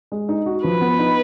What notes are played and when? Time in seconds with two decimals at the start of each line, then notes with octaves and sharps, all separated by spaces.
0.12 G#3
0.29 D#4
0.46 F#4
0.64 F3 B4
0.81 B3
0.99 D#4